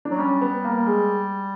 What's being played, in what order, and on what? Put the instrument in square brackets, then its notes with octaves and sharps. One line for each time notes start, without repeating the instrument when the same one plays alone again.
[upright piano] D4
[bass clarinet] F#3
[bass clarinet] G3 [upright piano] C#4
[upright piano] B3
A#3
G#3